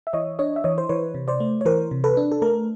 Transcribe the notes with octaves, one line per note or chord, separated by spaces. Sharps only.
E5
E3 C#5 D#5
D4 C#5 D#5
E5
E3 C#5 D#5
C5
E3 B4 C#5
C3
C5 D5
A3
C#5
E3 A#4 C5
C3
A4 B4
D4
A4
A3 A#4